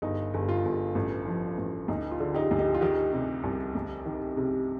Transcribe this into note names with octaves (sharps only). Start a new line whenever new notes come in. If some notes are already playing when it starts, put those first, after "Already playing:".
G1 D#4
G1
F4
G1
A1
F3
A1
D2 D#4
F4
D3
D#4 G4
D2
D#4 G4
F4
D#3 D#4 G4
C3
C2
D2
D#3
C3